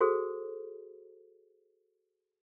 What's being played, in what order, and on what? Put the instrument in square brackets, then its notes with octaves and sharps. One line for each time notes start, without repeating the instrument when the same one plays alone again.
[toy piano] F#4 G#4 A4 C5